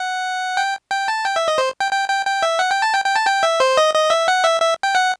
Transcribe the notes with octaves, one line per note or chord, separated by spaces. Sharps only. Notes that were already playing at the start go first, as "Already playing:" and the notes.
Already playing: F#5
G5
G5
A5
G5
E5
D#5
C5
G5
G5
G5
G5
E5
F#5
G5
A5
G5
G5
A5
G5
E5
C5
D#5
D#5
E5
F#5
E5
E5
G5
F#5